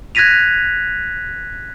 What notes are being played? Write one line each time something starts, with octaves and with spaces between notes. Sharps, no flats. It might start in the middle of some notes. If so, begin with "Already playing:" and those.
F#6 G#6 A#6 B6 D#7 F7